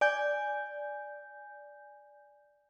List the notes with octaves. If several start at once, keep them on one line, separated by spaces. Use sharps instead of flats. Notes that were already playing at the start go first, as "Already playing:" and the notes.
D5 G#5 G6